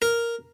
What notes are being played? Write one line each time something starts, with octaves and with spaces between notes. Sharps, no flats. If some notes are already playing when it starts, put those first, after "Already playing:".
A#4